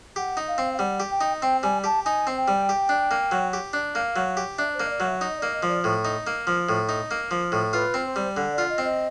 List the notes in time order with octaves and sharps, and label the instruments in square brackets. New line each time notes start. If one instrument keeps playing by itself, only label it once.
[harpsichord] G4 [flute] F#5
[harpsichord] D#4
[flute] F5
[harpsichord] C4
[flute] F5
[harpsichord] G3 [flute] F#5
[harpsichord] G4
[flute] G5
[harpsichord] D#4
[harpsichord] C4 [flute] G5
[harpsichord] G3 [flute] G#5
[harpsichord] G4 [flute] A5
[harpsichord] D#4 [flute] G#5
[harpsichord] C4
[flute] G5
[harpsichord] G3
G4
D4
A#3
F#3
G4
D4
[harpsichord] A#3 [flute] F5
[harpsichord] F#3
G4
[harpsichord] D4 [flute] E5
[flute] C5
[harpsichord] A#3
[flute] D#5
D5
[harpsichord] F#3
[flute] E5
[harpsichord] D#4 [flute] D#5
[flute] D5
[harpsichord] A#3
[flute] D#5
[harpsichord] F3
[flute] D5
[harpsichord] A2
D#4
A#3
F3
A2
D#4
A#3
F3
A2
[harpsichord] F4 [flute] B4
[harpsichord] C4
[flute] C5
[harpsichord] G3
D3
[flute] D5
[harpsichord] F4
[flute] D#5
[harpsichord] C4
[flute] D#5